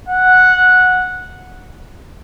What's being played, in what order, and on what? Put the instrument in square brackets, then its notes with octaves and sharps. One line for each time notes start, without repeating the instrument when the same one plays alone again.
[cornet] F#5